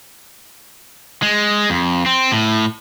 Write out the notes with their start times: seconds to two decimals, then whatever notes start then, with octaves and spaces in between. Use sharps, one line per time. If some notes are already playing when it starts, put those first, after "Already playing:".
1.23 G#3
1.70 F2
2.06 C4
2.32 A2